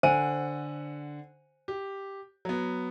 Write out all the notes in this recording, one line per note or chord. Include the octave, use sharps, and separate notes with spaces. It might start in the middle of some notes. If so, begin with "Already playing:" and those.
D3 C5 F#5 G#5 D#7
G4
F#3 B3